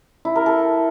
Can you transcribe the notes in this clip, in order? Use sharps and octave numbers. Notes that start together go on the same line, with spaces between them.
E4
A#4
A4